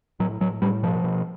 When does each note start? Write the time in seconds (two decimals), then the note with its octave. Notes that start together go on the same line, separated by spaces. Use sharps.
0.20 A2 F#3
0.41 A2 F#3
0.62 A2 G3
0.83 B2 F3
1.04 B2